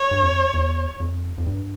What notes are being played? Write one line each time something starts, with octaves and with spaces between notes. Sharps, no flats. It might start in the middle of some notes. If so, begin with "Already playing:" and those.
Already playing: C#5
G2
F2
E2
F2
F2
G2